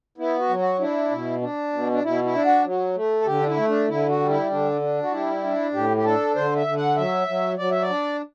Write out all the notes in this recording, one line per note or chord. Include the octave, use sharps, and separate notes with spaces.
B3 E4
F#4
F#3
F#4
D4 E4
B2
D4
B2
D4
B2 E4
E4
D4
F#4
F#3
A3
A4
D3 G4
D4
E4
A3
D4
D3 E4
F#4
G3
E4
D3 D4
D4
F#4
G3 E4
D4
A2 G4
G4
D4 A4
D3 C5
E5
D3
F#5
F#3 E5
F#3
F#3 D5
E5
D5
D4